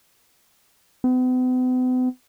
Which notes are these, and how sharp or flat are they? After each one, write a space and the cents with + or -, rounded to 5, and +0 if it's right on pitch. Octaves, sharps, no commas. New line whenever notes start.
B3 +45